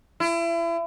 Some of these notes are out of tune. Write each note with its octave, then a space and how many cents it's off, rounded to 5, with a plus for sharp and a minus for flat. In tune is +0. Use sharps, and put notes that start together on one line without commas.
E4 +35